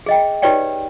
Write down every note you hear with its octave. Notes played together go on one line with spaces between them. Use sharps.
G#4 D#5 G5
D#4 G4 B4 C#5 D5 G5